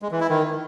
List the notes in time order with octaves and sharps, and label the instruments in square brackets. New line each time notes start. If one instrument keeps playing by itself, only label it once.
[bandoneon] G#3
E3
E4
D#3